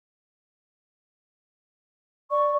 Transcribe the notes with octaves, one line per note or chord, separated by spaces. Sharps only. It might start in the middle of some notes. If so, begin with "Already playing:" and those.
D5 C#6